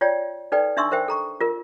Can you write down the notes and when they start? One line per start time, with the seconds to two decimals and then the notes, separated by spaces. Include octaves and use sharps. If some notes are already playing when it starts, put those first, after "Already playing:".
0.01 F4 C#5 D5 G5
0.52 D#4 A4 B4 D5 G5
0.77 D4 D#4 E5 C6 C#6 E6
0.91 A#4 C5 E5 G5
1.08 A4 A#5 C#6
1.41 F4 A#4